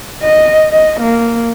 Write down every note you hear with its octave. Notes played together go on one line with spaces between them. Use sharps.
D#5
D#5
A#3